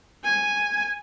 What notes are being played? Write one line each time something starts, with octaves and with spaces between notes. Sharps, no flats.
G#5